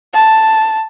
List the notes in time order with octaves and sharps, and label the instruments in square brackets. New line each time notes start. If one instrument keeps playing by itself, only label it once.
[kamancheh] A5